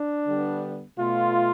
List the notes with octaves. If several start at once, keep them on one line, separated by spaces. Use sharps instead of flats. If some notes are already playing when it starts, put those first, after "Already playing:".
Already playing: D4
D3 G3 B3
B2 A3 F4